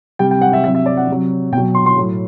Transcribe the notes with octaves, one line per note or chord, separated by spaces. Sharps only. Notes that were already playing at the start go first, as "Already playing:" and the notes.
C3 G3 G5
G5
F#5
E5
C3 F#3 E5
E5
D5
F#5
C3 F#3
B2 G5
F#3
C6
C6
A2 F#3